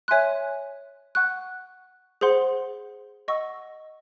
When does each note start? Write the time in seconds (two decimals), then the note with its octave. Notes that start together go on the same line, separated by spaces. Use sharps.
0.08 C#5 E5 G#5 C6 F#6
1.15 F#5 C#6 F#6
2.21 G#4 C5 F#5 C6
3.28 D#5 F#5 C#6 E6